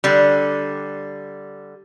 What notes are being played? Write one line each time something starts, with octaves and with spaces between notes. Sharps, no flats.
D3 G3